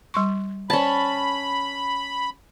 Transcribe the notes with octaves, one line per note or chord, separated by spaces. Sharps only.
G3 C6 C#6
C#4 C5 D5 A5 B5